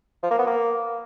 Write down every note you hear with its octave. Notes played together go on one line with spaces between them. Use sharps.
F3
A#3
B3
A#3